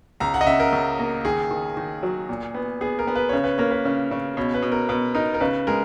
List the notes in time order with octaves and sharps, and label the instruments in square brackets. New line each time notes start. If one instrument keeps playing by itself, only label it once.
[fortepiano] C#2 [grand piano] A#5
[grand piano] F#5
D#5
[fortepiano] C#3 [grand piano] E5
[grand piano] A#4
[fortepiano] C#2
A#3
[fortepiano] D#3 [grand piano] G#4
[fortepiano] D#3
D#3
F#3
A#2
B3
[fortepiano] B3 [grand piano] G#4
[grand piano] A#4
[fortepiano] B3
[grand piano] B4
[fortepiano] C#3 [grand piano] C#5
[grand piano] B4
[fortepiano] A#3 [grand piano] C#5
[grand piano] B4
[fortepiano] C#3
C#3
[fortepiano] B2 [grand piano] C#5
[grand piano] B4
[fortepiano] B2
[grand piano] A#4
[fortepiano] B2 [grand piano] B4
[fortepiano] D#4 [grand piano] A#4
[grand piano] A#4
[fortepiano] C#3 [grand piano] B4
[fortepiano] G#3 [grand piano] A#4